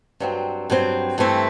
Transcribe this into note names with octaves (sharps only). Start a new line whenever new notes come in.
G2 F#3 C4
G2 F#3 C4
G2 E3 A3 C4 E4